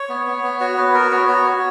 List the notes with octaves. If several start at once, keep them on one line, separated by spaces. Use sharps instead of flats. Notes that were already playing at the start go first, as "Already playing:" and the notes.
Already playing: C#5
B3
B3
B3
F#4 C#5
B3 B4
F#4 A#4
B3 C#5
F#4 C#5
F#4